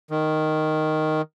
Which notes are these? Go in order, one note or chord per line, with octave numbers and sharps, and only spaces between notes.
D#3